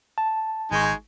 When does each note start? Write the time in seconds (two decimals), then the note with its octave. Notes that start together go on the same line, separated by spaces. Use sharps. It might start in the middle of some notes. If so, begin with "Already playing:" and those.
0.18 A5
0.72 G#1 G#3 D#4 G#5 C#6